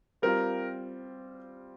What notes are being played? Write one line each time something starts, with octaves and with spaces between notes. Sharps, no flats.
G3 C4 F4 A#4